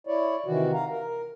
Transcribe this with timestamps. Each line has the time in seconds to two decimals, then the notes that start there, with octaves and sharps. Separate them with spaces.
0.07 E4 C#5 D5
0.46 C3 D#3 E3 F#4
0.74 F5 A#5
0.90 A#4